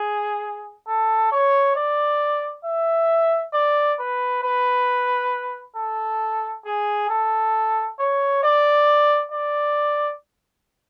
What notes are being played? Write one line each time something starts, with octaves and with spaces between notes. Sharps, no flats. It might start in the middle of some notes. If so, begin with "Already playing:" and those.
Already playing: G#4
A4
C#5
D5
E5
D5
B4
B4
A4
G#4
A4
C#5
D5
D5